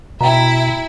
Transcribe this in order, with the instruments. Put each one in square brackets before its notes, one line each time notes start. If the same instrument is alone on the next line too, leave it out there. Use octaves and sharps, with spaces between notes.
[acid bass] B2 [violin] E4 E5 [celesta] G5 A#5